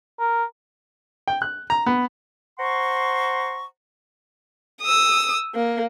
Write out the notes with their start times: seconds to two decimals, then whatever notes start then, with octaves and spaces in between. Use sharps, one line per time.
0.20 A#4
1.28 G5
1.42 F#6
1.70 A#5
1.86 B3
2.59 C5 F#5 A#5 C6 C#6
4.81 D#6 E6
5.55 A#3